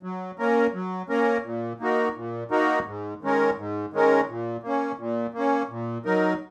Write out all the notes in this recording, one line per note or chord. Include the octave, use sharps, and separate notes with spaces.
F#3
A#3 C#4 A#4
F#3
A#3 C#4 A#4
A#2
A#3 D#4 F#4 A#4
A#2
A#3 D#4 F#4 A#4
G#2
D#3 G#3 C#4 A#4
G#2
D#3 G#3 C#4 A#4
A#2
A#3 C#4
A#2
A#3 C#4
A#2
F#3 D#4 A#4